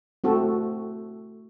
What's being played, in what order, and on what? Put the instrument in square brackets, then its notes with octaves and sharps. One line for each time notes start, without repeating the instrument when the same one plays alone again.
[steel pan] A3 C4 F#4 A4